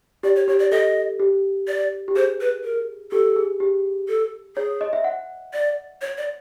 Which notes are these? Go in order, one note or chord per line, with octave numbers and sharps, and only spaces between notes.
G4 D5
C#5
G4 C#5
D5
A4 D#5
G4
D5
G4
G#4 C5
B4
A#4
G4 A4
G#4
G4
A4
G#4 C#5
D#5
E5
F#5
D5
C#5
D5